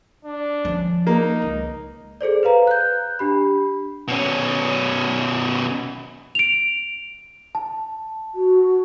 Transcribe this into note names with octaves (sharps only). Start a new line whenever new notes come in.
D4
F3 C#4
A#3 D#4
C#2
G#4 A4 C5 D5
B4 C5 F5 A#5
F#6 G6
D4 G4 B5
B2 C#4
D7 F7
A5
F#4